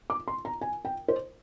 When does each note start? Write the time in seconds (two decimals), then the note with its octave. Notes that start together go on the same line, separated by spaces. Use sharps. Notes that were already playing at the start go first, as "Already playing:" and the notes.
0.10 D6
0.28 C6
0.45 A#5
0.61 G#5
0.85 G5
1.08 C5